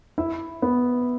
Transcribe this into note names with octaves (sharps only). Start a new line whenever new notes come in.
E4 E5
B3